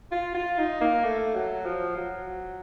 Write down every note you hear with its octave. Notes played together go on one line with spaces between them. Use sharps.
F4
F4
D#4
A#3
A3
F#3
F3
F#3